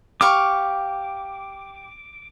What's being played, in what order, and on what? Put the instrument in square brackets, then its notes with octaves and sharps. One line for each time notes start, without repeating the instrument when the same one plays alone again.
[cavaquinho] G4 F5 C#6 [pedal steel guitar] D6